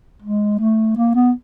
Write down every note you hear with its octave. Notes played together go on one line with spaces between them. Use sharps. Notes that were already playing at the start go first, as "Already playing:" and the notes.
G#3
A3
A#3
B3